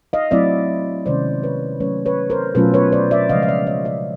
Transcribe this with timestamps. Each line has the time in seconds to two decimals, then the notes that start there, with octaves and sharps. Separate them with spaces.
0.13 D#5 F5
0.31 F#3 A3 C4 E4 D5 E5
1.06 C3 D#3 G#3 C#4 C5 D5
1.43 B4 C#5
1.80 F#3 A3 C#4 B4 C#5
2.06 B4 C#5
2.30 A#4 C5
2.55 B2 F#3 A3 C#4 F4 A4 B4
2.74 B4 C#5
2.92 C5 D5
3.11 D5 E5
3.29 C#3 F3 G#3 D#5 F5
3.43 F5
3.48 D5 E5
3.67 C#5 D#5
3.85 D5 E5